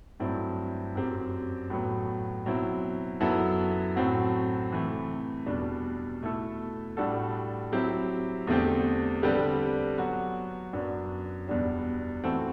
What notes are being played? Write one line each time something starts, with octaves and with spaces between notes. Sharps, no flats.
G2 F#3 A3 C4 E4
F#2 F#3 C4 G4
A2 F#3 B3
B2 F#3 C4 E4
F#2 F#3 B3 E4 A4
A2 F#3 C4 F#4
C3 E3 A3
E2 B2 G3 D4
B2 A3 E4 A4
A2 G3 D4 F#4 A4
F#3 C4 E4 G4
E2 D3 A3 C4 G4
D3 G3 C4 G4 B4
F#3 B3 F#4
F#2 F#3 B3 D4
E2 B2 G3 B3 D4
E3 A3 C4 F#4 A4